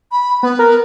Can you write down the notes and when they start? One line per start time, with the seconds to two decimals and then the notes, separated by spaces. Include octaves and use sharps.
0.12 B5
0.43 B3 B4
0.59 A#4